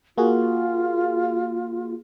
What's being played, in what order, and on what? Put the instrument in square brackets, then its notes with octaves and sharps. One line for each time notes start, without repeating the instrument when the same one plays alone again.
[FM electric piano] A#3 F#4 G#4 [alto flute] F4